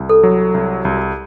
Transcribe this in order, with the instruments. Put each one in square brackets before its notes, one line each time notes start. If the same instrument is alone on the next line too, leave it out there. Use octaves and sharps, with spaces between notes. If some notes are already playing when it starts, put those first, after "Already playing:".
Already playing: [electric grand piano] C2
[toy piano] A4
[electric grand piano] F#3
C2
C2